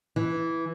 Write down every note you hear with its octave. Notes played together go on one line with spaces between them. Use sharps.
E3